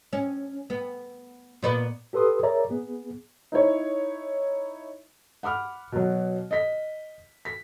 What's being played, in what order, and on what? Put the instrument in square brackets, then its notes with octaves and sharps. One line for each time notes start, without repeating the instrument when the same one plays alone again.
[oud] C#4
B3
A#2 B3 D5
[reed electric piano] G4 A4 B4 C6 D#6
G#4 A#4 C#5 D5 E5 A#5
B3 G#4
[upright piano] D#4 E4 C#5
[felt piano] F#5 B5 D6 F6
B2 F#3
D#5 B6
B6